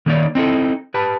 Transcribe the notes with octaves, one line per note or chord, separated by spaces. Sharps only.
D#3 A3 A#3 D#4 C#5 D5
C4 D#4 E4 A4
G4 B4 A5